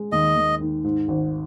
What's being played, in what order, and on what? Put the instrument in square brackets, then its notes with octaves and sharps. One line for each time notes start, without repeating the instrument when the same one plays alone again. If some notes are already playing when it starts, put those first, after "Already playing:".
Already playing: [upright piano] G#3
[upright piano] D#2 [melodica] D#5
[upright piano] D#2
D#3
G#2
G#1